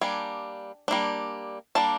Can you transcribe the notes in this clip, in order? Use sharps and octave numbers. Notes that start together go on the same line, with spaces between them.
G3 A#3 D4 G#5
G3 A#3 D4
G3 A#3 D4 A5